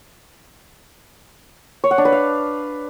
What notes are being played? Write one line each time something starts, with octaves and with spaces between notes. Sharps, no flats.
C#5
F#5
D4
B4
F5